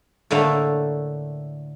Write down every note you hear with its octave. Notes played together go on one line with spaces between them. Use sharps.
A2 D3 A3 A#3